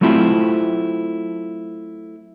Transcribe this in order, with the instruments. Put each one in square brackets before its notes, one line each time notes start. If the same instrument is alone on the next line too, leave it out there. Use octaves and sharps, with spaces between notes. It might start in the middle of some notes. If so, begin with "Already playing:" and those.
[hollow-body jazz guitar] F#3 A3 C4 E4 F4 G4